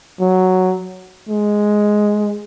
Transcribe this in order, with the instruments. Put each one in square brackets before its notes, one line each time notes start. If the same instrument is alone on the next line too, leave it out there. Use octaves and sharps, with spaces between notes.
[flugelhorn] F#3
G#3